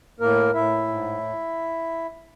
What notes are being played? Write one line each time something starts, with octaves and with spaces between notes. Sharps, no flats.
A2 A#3 A#4
A2 E4 E5
G#2